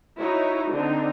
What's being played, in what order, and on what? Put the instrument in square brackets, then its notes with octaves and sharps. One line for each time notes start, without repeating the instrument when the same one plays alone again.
[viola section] D#4 E4 F#4 C#5
D3 C4 D4 D#4